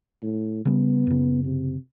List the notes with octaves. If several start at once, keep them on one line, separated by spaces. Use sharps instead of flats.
A2
C#3 G3 B3
F#2 C#3
C3